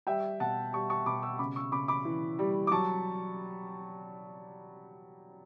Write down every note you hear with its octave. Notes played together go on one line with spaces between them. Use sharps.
G3 E5 G5
B2 F#5 A5
G3 A5 C#6
A5 C#6
B2 B5 D6
C#6 E6
C#3 B5 D6
C#6 E6
C#3 B5 D6
B5 D6
E3
G3
D6
F#3 A5 C#6